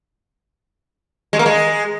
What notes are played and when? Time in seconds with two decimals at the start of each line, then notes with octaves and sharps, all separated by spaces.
1.33 G#3
1.39 A#3
1.46 G#3